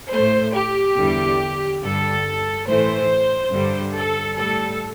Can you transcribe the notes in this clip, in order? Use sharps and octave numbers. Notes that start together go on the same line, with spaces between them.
A2 A3 C5
G4
E2 D3 G3
G2 D3 G3 A4
A2 E3 A3 C5
G2 D3 G3
A4
G3 A4
A2